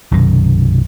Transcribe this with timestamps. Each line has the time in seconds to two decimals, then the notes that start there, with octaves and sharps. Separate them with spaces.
0.11 B1 F#2 C3 D#3